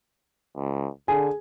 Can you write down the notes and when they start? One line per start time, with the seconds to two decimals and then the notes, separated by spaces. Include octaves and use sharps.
0.56 C#2
1.08 D3 G#4 G#5